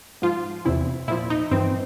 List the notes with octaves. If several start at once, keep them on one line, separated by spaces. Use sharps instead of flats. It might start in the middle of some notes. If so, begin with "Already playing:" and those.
G#2 F3 F4
E2 C3 E3 E4
A#2 F3 E4
D#4
G2 E3 C4